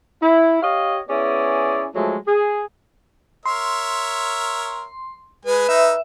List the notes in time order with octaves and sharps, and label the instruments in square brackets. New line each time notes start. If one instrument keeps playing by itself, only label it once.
[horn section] E4
G4 C#5 D#5 F5
B3 C#4 E4 G#4 D5
F3 F#3 G#3 A3
G#4
[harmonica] A#4 C#5 E5 [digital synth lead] C6
[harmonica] G#3 G#5 [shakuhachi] B4
[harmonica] D#4 E6 [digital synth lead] E5